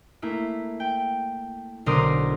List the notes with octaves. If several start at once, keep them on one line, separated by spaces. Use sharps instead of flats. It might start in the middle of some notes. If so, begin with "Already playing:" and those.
A3 A#3 E4
G5
B1 D3 A#4 C5 D5 D#6